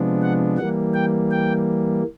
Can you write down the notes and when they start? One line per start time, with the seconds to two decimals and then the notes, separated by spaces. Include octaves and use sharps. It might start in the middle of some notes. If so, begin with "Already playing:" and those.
Already playing: C3 F3 G#3 B3 D4
0.22 F#5
0.58 E3 G3 A#3 F#5
0.94 G5
1.31 G5